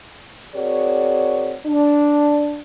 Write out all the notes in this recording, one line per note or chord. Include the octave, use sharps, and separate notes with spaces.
C4 F#4 G#4 A#4 C#5 D5
D4